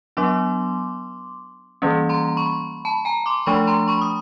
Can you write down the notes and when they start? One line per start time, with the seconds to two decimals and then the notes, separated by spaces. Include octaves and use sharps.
0.17 F#3 B3 D4 C6 D6
1.82 E3 G3 A#3 C#4
2.09 A#5 C6
2.37 B5 C#6
2.85 A5 B5
3.05 G#5 A#5
3.26 C6 D6
3.46 F3 A3 D4 B5 C#6
3.67 A#5 C6
3.88 B5 C#6
4.01 D#6